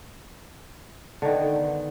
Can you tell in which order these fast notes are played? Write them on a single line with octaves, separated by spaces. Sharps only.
D3 D#3 B3